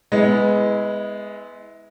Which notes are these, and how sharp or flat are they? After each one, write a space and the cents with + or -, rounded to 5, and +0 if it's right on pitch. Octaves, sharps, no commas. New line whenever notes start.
G#3 +0 B3 +10 E4 -25